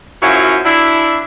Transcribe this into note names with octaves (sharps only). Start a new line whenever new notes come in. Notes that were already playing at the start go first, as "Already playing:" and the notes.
F#2 F3 F#3 E4 F#4
D4 E4